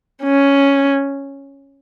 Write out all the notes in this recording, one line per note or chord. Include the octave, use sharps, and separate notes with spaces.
C#4